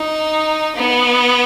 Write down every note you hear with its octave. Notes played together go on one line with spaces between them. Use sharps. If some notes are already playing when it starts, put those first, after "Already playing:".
Already playing: D#4
B3